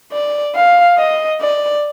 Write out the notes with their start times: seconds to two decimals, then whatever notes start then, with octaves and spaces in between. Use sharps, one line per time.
0.12 D5
0.55 F5
0.98 D#5
1.41 D5